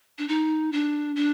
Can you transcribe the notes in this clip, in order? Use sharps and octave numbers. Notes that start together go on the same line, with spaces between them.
D4
D#4
D4
D4